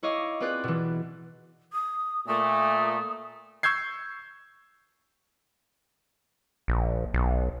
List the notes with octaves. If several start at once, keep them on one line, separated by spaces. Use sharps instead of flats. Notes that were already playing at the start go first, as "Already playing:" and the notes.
E4 C#5 D#5 F5 D6
C4 F4 G#4 B4 D5 F#6
B2 E3
D#6
A#2 A3 D#6
C#6 E6 G6 G#6 C7
A#1
B1